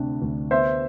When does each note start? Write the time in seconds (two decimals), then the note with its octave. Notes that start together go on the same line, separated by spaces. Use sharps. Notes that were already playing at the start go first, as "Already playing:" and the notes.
Already playing: D2 C3 D4
0.22 D2
0.51 B3 C5 E5